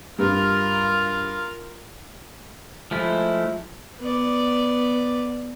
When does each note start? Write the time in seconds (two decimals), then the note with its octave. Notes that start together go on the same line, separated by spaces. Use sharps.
0.18 G2 F4 A#4
2.91 F3 G#3 A3 E4
4.00 B3 D5